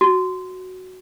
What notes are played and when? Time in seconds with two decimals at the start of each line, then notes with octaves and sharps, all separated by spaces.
0.01 F#4